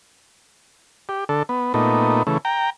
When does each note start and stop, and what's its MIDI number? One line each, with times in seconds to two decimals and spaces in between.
1.09 1.24 67
1.29 1.43 50
1.29 1.43 69
1.49 1.73 59
1.74 2.23 46
1.74 2.23 57
1.74 2.23 59
1.74 2.23 63
2.27 2.38 49
2.27 2.38 52
2.27 2.38 57
2.45 2.70 79
2.45 2.70 82